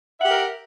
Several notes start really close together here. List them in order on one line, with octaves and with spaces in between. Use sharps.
E5 F#5 G4 A#4